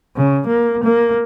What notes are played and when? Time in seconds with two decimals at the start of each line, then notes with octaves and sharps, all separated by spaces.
0.16 C#3
0.47 A#3
0.83 A#3